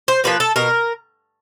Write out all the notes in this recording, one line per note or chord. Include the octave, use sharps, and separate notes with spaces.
C5
F3 A#3 B4
A4
B2 A#4